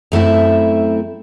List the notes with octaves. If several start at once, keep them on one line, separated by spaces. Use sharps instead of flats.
F#2 A3 C4 E4